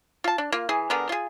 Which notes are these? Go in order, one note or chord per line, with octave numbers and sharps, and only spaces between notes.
F4 A5
D4
A#3 F4
E3 G#4
D3 B3 G#4 A#4
F4 G#4